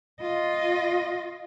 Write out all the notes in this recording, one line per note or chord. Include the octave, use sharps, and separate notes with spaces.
F4 D#5